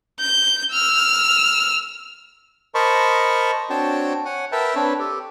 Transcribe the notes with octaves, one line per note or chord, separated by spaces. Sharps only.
G6
E6 F6
A#4 C5 D#5 A5 B5 C#6
C4 D4 F#4 C#5 G5 A5
C#5 F#5 G#5
A#4 B4 E5 G5 A5
C4 D4 B4 C#5
G4 A4